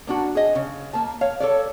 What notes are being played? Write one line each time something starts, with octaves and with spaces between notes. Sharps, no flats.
A#3 D4 F#4
G#4 D#5
C#3
A#3 A5
C#5 F5
A4 C#5 D5